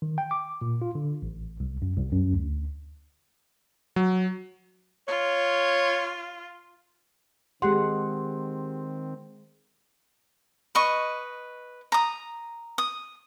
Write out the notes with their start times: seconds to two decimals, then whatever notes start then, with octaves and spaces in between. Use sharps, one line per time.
0.02 D#3
0.18 G5
0.31 D6
0.62 A#2
0.82 F4
0.95 D3
1.22 A1
1.60 C2
1.82 F#2
1.97 C2
2.13 F#2
2.33 D2
3.96 F#3
5.08 F4 C#5
7.62 D#3 G#3 C4 G4 F#5 C6
10.75 B4 D#5 C#6
11.92 A#5 D#6
12.78 D#6